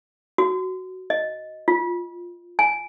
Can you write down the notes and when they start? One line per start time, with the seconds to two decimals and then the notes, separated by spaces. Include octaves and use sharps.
0.38 F#4
1.10 D#5
1.68 F4
2.59 G#5